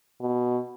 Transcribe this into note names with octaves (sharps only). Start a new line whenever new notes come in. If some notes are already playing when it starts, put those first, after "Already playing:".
B2